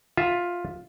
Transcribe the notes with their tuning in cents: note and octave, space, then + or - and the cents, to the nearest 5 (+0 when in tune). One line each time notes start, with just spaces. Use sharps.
F4 +10 E5 +0